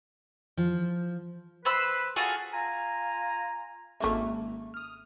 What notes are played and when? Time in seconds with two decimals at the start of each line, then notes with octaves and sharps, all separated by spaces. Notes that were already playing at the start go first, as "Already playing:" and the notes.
0.57 F3
1.65 B4 C5 B5 E6
2.16 F4 F#4 G#4 A4
2.53 F4 G#5 A#5
4.00 G#1 C#3 A3 A#3 E5
4.74 D#6 F6